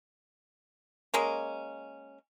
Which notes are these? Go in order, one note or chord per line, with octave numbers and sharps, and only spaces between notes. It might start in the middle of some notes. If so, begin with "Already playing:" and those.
G#3 A#3 C#4